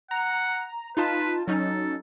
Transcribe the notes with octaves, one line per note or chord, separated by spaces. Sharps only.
F#5 A#5
D#4 F4 B4 A5
F#3 C#4 D#4 A4